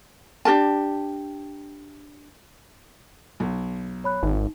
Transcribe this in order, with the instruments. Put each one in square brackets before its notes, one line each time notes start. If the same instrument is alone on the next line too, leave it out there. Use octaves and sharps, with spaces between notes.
[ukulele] D4 G4 A#4 A5
[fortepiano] B1
[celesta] C#5 B5 F#6
[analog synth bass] G#1 [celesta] D#4